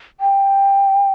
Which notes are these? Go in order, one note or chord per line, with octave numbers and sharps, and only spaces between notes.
G5